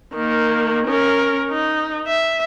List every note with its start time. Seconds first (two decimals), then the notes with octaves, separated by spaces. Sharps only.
0.15 D#3 A#3
0.87 C#4 A#4
1.50 D#4
2.07 E5